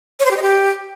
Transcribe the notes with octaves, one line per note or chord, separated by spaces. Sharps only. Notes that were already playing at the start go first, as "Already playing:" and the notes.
C#5
C5
G4
D#5
G4